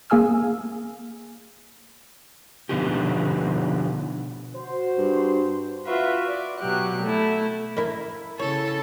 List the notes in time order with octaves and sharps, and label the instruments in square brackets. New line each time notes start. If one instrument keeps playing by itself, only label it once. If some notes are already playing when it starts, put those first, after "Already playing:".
[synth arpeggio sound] A#3 G#4 G#5 E6 F6
[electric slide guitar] B2 D3 F3 B3 D#4 G4
[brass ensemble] F#4 C5
[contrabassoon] G2
[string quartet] F4 F#4 B4 E5
D5
B2 F#3 G4 F#6
A3 E4
[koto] A#3 E4
[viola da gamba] C#3 A4 [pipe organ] E4 [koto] C#5